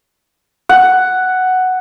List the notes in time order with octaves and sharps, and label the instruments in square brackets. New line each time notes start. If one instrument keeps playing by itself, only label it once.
[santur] F#5